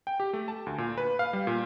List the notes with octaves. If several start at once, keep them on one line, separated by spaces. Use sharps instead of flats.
G5
G4
A3
A5
D2
A#2
B4
F5
G3
A#2